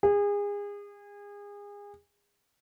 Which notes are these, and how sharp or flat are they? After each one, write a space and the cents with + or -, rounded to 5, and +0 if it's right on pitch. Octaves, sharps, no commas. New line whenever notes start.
G#4 -30